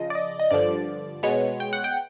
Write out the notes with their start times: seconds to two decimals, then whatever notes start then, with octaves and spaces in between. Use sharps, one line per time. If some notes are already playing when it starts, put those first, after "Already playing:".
Already playing: C#3 F3 D#5
0.10 D5
0.15 D#5
0.40 D#5
0.51 G2 D3 F3 D5
1.23 B2 G#3 B3 C#5
1.60 G5
1.73 F#5
1.84 G5